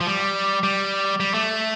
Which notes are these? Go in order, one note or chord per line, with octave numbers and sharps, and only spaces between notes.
F3
G3
G3
G3
A3